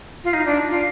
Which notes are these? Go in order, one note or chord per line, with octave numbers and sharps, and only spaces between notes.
F4
D#4
D4
F4